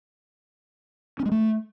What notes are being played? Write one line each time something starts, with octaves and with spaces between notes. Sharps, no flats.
C#4
G#3
A3